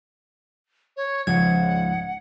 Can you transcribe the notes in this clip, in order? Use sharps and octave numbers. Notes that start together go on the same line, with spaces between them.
C#5
C#2 G#2 C#3 F3 F#5 G#6